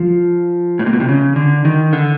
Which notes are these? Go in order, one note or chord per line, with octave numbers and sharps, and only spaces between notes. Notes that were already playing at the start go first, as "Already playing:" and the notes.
Already playing: F3
A2
A#2
B2
C3
C#3
D3
D#3
D3